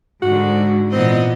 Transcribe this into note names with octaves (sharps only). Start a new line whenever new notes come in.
G#2 D3 F#4
A#2 E3 B3 C4 D#5